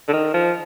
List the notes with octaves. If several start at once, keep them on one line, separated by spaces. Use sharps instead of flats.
D3
D#3
F3